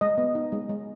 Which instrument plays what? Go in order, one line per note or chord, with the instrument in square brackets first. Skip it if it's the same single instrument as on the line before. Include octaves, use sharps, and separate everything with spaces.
[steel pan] G#3 D#5
B3
D#4
G#3
G#3